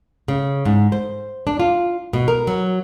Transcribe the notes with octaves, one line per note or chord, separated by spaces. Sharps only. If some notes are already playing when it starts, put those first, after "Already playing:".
C#3
G#2
C5
D4
F4
B2
A#4
F#3